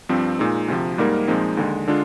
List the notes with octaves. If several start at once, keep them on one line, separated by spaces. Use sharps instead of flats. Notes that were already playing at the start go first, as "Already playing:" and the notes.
G2 F3 C4
A#2 G#3 D#4
D2 C3 F3
G#2 G3 A#3 D#4 A#4
A#2 F3 G#3 C4 D#4
D#2 D3 G#3
D3 G#3 D4 F4